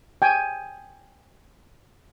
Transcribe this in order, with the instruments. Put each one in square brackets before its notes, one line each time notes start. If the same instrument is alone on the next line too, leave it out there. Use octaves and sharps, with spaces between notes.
[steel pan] G5 G#5